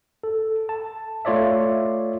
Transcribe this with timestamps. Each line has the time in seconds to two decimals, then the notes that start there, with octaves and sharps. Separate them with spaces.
0.24 A4
0.69 A5
1.25 A3 F4 C#5 D5 E5